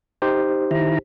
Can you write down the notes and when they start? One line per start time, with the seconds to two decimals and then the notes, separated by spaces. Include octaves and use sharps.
0.22 D#4 G4 C5
0.71 D#3 E4 A#5